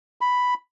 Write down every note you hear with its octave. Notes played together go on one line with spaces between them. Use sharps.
B5